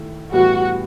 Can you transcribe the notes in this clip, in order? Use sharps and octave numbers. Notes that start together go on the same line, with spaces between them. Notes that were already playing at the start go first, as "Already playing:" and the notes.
Already playing: D#3 A3 E4
A2 E3 G3 B3 F#4